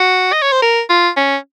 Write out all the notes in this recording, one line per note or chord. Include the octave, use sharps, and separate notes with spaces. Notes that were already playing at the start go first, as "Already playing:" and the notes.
Already playing: F#4
D#5
C#5
C5
A#4
F4
C#4